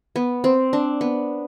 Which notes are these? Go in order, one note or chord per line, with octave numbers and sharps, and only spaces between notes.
B3
C4
D4
B3